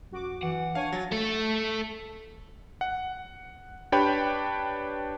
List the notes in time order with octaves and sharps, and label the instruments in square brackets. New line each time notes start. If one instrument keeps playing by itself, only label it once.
[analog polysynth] F#2 F#4 D6
[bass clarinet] E3 [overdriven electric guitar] F#5
[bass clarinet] D4 [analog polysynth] C#5 G#5 [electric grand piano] F5
[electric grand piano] F#3 [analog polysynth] A6
[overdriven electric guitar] A3 A4
[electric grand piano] F#5
D4 G4 B4 C#5 G5 B5